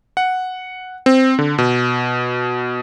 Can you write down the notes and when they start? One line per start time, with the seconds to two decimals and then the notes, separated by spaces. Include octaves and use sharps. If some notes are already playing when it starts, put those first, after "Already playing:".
0.17 F#5
1.06 C4
1.39 D3
1.58 B2